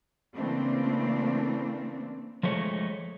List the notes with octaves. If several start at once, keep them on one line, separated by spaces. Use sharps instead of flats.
C#3 E3 A3 A#3 C4 D4
F3 G#3 A3 C#5